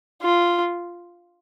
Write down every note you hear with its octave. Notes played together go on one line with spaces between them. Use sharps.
F4